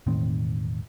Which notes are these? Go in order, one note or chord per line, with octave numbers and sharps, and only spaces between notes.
E1 A2 D#3 C4